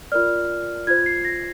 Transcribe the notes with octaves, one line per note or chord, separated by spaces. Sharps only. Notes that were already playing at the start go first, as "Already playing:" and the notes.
F4 A#4 D5 F6
F4 C5 G#6
C7
A#6